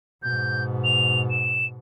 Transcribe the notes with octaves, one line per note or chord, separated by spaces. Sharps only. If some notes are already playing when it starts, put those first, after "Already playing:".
G#2 B2 G6
F7
E7